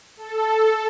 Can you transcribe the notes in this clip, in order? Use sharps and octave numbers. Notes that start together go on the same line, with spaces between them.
A4